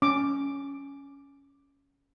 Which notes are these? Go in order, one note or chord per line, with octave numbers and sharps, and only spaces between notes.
C#4 D6